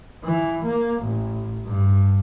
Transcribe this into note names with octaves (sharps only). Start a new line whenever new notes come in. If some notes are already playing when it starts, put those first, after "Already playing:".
E3
A#3
A1
G2